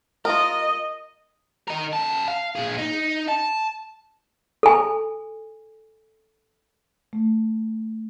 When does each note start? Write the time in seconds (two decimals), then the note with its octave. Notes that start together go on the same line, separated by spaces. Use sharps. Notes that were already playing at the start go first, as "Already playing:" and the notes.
0.25 F4 A#4 D#5
1.68 D#4 A#4
1.93 F#2 A5
2.28 F5
2.55 A#2 G#4
2.78 D#4
3.29 A5
4.63 A4 G#5
7.13 A3